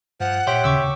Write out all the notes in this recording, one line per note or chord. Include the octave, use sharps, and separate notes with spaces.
G2 F3 F#5
A#2 G4 C#5 E5 C6
D#2 C#3 C#6 D6 E6